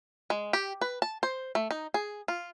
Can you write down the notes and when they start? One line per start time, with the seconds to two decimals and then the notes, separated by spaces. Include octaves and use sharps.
0.30 G#3
0.53 G4
0.81 B4
1.02 A5
1.23 C5
1.55 A3
1.71 D#4
1.94 G#4
2.28 F4